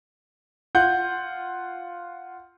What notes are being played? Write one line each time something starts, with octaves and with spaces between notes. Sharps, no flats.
F4 F#5 G6